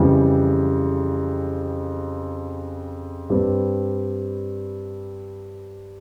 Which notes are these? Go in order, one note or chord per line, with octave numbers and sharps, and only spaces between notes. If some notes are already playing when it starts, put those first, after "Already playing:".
Already playing: F2 C#3 E3 G3
G2 G3 C4